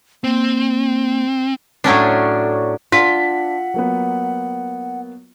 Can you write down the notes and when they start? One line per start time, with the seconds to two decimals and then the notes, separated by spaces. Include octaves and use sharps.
0.24 A#3 C4
1.84 A2 F#3 C#4 D4
2.92 D4 F4 F#5 B6
3.74 F#3 A#3 B3